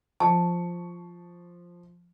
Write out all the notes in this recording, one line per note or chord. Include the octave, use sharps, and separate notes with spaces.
F3 A5 C#6